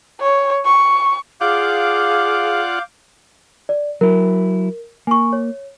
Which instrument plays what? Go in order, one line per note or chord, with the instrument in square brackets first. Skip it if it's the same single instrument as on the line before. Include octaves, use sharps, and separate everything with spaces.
[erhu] C#5
C#6
[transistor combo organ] F4 D5 F#5 [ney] G#4 [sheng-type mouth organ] F5 D6 G6
[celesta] D5
[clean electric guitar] F#3 E4 [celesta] A#4
[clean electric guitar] A#3 [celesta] G#5 C#6
[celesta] C#5